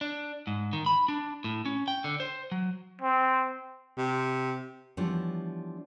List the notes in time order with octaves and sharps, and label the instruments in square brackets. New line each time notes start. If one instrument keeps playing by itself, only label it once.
[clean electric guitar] D4
G#2
D#3
B5
D4
A2
C#4
G5
D3
C5
F#3
[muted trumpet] C4
[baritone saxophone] C3
[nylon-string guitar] E3 F3 G3 B3 D4 C#5